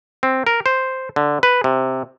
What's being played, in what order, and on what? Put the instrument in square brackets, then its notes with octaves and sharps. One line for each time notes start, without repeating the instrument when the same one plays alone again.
[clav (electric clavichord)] C4
A#4
C5
D3
B4
C3